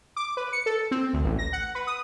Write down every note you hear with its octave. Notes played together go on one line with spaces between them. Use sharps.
D6
B4
C#7
A4
C4
D2
A1
A#6
F#5
B4
D#6